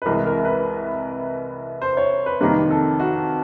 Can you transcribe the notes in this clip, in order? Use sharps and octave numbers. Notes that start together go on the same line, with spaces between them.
B4
C2 C3 E3 G#3 A#4
A#4
B4
C5
C#5
B4
F2 C3 D#3 G3 A#3 B4
A4
F#4